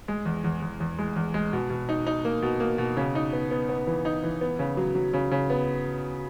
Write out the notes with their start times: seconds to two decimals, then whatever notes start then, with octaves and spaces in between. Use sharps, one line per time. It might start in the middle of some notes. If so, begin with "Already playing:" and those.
0.08 G#3
0.25 E2
0.44 E2
0.62 E2
0.80 E2
0.98 G#3
1.16 E2
1.34 G#3
1.53 B2
1.70 B2
1.89 D#4
2.06 D#4
2.25 A#3
2.42 B2
2.60 A#3
2.78 B2
2.97 C#3
3.15 D#4
3.33 B3
3.51 B3
3.69 B3
3.87 E3
4.05 D#4
4.23 E3
4.41 B3
4.59 C#3
4.77 F#3
4.95 F#3
5.13 C#3
5.31 C#3
5.50 B3